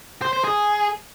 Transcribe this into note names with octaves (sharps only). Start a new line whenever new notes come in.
C5
C5
G#4